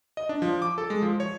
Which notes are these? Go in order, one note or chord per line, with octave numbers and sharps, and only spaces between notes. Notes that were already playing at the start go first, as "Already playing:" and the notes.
D#5
D4
F3
D6
A4
G#3
F3
C#5